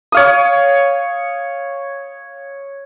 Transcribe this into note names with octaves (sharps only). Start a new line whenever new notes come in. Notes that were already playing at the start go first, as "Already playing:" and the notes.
C#5 F5 D#6